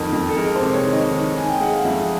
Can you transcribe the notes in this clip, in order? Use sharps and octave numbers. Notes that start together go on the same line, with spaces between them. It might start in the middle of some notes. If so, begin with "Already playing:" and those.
Already playing: F2 D#3 A#4
F2
A4
G#3 A#4
C5
C3
C#5
D#3
D#5
D#3
D#3 G#5
G5
G#3 F#5
F5
F2 E5